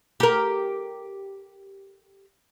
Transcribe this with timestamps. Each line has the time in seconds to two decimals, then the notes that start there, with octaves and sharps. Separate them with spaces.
0.20 G4 A#4